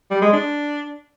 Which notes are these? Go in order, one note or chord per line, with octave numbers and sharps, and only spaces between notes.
G3
G#3
D4